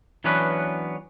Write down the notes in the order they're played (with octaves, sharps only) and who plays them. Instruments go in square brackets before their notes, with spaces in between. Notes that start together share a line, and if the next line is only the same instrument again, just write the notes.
[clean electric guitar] E3 F#3 B3 C#4 D4 B4